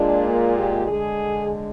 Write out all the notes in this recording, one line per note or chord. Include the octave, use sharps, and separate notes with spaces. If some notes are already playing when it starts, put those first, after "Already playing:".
Already playing: A#2 G#3 D4
A#3
G4
D3 G#3 G#4